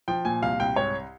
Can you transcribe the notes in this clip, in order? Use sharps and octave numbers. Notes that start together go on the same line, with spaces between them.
F3 G5
A#2 G#5
C2 F5
C2 G5
G#2 C#5